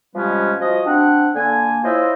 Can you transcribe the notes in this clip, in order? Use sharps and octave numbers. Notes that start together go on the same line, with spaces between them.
C3 F3 G3 G#3 B3 C#4
F3 F#4 D#5
C4 D4 F#5
D3 A#3 G#5
E4 F4 C5 C#5 D#5 E5